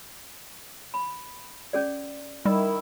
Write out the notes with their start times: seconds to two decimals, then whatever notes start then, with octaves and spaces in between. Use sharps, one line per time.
0.94 B5
1.73 C#4 G#4 D5
2.45 D#3 G3 E4